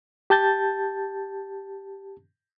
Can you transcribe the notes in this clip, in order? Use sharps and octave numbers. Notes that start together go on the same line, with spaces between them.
G4 A5 G6 A6